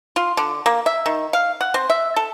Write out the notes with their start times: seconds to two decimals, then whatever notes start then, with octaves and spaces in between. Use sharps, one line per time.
0.16 F4
0.37 D3
0.66 A#3
0.86 E5
1.06 D#3
1.33 F5
1.61 F#5
1.74 C4
1.90 E5
2.16 A4